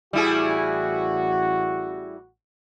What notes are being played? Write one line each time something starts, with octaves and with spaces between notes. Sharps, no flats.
A1 G3 E4 F#4 G#4